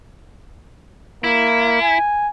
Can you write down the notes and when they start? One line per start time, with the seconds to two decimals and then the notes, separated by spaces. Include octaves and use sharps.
1.24 A#3 E4
1.82 G#5